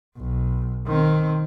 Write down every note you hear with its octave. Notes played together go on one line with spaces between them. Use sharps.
B1
D#3 C4